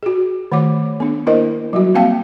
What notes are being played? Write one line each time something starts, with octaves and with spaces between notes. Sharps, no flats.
F#4 G#4
D#3 A3 C#5 D6
B3 D4
A#3 D4 E4 A#4 C5 D#5
F#3 G3 F#4
G3 A#3 C4 F5 G5 A5